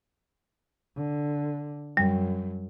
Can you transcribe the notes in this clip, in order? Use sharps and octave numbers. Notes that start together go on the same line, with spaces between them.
D3
F#2 G3